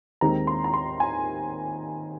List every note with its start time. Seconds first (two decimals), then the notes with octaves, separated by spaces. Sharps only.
0.21 D#2 D#3 G#3 C4 D#4 A#5
0.47 C6
0.64 A#5
0.74 C6
1.00 G#5